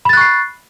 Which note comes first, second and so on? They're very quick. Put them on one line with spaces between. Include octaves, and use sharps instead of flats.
B5 A6 F#6 C#6 C7